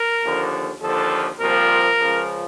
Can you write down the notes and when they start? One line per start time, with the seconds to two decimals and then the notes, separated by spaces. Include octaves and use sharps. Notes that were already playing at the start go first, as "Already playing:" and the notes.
Already playing: A#4
0.23 D#2 D3 F3
0.81 D#2 D3 F3 A4
1.40 C2 A#2 F3 A#4
1.99 C#2 C#3 F3